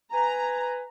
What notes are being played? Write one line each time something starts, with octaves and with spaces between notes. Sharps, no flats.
B4 G#5 A#5